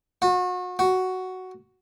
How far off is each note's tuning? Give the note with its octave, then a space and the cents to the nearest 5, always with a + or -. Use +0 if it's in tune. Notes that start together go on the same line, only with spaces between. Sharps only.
F#4 -35
F#4 +5